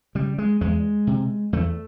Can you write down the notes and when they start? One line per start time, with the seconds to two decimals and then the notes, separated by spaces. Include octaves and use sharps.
0.15 C#3 G3
0.38 G#3
0.61 E2 G#3
1.07 C3
1.53 E2 A3